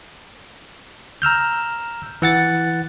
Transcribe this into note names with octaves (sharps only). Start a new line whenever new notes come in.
A#5 E6 F6 G6
E3 F#5 A6